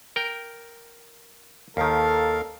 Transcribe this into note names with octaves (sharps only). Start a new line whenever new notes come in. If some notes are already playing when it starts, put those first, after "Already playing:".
A#4 G5
D#2 D#3 A4 A#4 F5